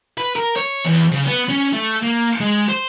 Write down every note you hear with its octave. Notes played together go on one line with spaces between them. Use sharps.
B4
A#4
C#5
E2
C#3
B3
C#4
A3
A#3
G#3
C5